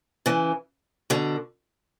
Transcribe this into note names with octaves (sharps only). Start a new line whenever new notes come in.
C#3 E3
B2 D3